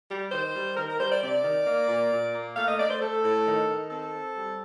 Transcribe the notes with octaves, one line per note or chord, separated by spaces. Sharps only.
G3
D#3 C5
G3
D#3 A#4
A#4
G3 C5
D5
C3 D5
D#3
A#3
A#2
A#2
A#3
A3 F5
D#5
A3 D5
C5
A3 A4
A2
D#3
D#3
C4 A4
C4
G3